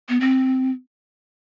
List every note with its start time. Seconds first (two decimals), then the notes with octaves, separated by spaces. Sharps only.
0.09 B3
0.21 C4